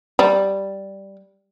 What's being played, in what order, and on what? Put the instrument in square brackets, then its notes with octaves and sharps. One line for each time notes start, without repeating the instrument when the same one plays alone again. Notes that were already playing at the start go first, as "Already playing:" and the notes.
[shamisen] G3